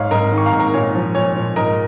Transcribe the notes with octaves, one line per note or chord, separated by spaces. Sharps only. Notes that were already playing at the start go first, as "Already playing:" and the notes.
Already playing: G#2 C#5 F5
G#2 A#4 D#5
D#3
C#6
F5 A#5
G#2
A#4
A#2 C#5
F3
A#2 C#5
A#2
G#2 A#4 D#5